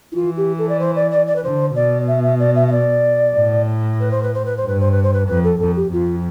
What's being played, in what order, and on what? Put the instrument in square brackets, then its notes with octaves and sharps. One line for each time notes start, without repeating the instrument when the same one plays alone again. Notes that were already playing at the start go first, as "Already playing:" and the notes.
[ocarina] E4
[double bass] E3 [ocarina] F4
[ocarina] G4
A4
D5
C5
D5
D5
D5
B4
[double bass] D3 [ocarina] C5
[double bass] B2 [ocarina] D5
[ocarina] E5
E5
D5
E5
E5
D5
[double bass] A2
[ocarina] B4
C5
B4
C5
B4
C5
[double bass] G2 [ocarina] B4
[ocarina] C5
B4
C5
B4
[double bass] F2 [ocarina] B4
[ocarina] A4
[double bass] F2 [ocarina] A4
[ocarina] G4
[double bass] F2 [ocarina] F4